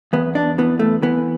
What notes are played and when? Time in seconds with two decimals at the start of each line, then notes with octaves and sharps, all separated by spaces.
0.13 E2 B3
0.35 D4
0.58 E3 B3
0.79 A3
1.02 E3 B3